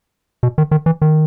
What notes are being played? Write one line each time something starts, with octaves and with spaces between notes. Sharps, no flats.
B2
D#3
D#3
E3
D#3